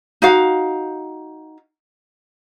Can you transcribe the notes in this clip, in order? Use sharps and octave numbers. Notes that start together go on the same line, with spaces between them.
D#4 F#4 F5